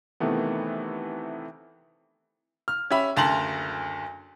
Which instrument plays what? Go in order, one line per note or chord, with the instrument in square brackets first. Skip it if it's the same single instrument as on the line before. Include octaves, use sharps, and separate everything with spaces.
[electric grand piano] C3 D#3 E3 A3 B3
[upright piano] F6
C#4 G4 E5 B5
F#1 D2 A5 A#5 C6 F#7